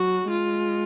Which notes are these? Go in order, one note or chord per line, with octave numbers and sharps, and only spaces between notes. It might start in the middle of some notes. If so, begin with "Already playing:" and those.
Already playing: F#3 F#4
G#3 F4